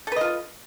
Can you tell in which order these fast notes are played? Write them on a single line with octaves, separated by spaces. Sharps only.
A4 B4 D#5 F4